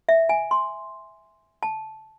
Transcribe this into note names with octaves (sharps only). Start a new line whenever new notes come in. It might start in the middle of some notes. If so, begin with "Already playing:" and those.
E5
G#5
C6
A5